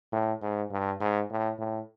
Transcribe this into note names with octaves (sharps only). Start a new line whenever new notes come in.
A2
G#2
G2
G#2
A2
A2